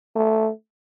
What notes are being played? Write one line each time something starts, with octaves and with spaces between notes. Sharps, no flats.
A3